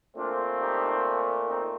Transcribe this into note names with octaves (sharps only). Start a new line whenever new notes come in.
A#2 A3 C4 D4 F4
D#4 G4
C4 D#4